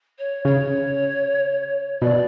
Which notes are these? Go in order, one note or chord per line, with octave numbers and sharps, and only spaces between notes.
C#5
C#3 C#5
B2 D5